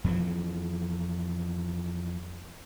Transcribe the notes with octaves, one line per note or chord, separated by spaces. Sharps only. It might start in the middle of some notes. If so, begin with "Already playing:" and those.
F2 E3 F3